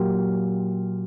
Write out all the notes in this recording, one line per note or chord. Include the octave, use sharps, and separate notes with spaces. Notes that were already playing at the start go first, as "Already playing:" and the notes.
Already playing: A#2 F#3 A#3 F4 G4